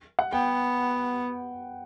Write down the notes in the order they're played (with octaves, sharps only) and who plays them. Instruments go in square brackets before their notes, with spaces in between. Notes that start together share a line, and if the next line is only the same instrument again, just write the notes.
[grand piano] F#5
[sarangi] B3 [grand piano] G5